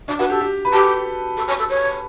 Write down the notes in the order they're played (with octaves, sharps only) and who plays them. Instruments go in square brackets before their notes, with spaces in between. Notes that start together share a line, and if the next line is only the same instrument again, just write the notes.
[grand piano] D4 [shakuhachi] D5
[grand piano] F#4 [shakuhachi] B4
[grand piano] G4 [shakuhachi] A4
[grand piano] G4
B4
[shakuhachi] G4 [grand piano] A4
[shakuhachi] A4
C#5
A4
C#5